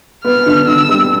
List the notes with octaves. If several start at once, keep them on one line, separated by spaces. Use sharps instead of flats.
B3 F6
D3
D3 E6
G3